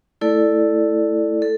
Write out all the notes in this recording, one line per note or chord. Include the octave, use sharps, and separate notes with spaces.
A3 E4 A4 D5
A4